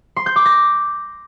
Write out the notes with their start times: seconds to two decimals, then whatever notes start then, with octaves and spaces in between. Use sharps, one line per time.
0.16 C6
0.26 G6
0.36 D6
0.45 A#6